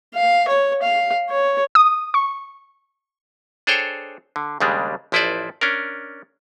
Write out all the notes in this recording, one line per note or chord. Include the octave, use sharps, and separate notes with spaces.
F5
C#5
F5
C#5
D#6
C#6
D4 G#4 A4 C5 C#5 G5
D3
D#2 C#3 G3 G#3 D4
A1 F3 E4 B4 C5 D5
C#4 D4 A#4